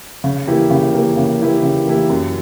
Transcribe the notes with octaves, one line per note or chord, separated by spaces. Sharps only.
C#3
E3 A#3 E4 G4
C#3
E3 A#3 E4 G4
C#3
E3 A#3 E4 G4
C#3
E3 A#3 E4 G4
F#2